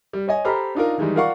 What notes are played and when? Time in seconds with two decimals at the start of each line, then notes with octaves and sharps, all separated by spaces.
0.13 G3
0.28 C#5 D#5 G#5
0.45 G4 A4 C5 A#5 B5 F6
0.75 D4 D#4 F4 A#4
0.98 D#3 E3 G3 G#3 D#4
1.15 F4 A#4 D5 F5 F#5 C#6